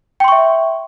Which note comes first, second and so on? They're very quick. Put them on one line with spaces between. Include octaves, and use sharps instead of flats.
G5 C6 C#6 E5